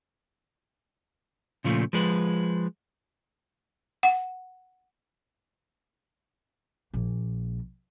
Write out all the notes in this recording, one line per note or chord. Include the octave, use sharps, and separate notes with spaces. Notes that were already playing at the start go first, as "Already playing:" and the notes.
A#2 C#3 F3 A3
F3 G#3 B4
F#5
A#1 A#3